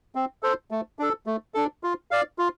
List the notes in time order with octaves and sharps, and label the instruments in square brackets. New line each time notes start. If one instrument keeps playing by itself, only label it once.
[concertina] C4
A4 C5
A3
D4 A4
A3
D4 A4
F4
D5 F5
F4